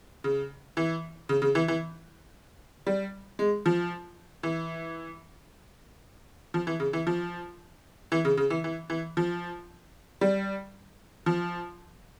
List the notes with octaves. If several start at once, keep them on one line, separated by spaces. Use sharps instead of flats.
C#3
E3
C#3
C#3
E3
E3
G3
G#3
F3
E3
F3
E3
C#3
E3
F3
E3
C#3
C#3
E3
E3
E3
F3
G3
F3